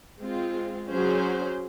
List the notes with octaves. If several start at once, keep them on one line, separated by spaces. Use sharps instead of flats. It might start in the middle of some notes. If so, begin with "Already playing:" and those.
G#3 C4 F4
F#3 C#4 G#4 C5